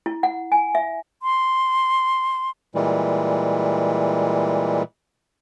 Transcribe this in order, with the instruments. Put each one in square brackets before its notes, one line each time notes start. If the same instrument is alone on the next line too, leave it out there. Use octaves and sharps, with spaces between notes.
[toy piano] E4
F#5
G#5
E5
[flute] C6
[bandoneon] A#2 E3 G3 G#3